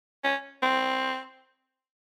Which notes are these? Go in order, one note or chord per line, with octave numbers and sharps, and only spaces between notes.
C#4
C4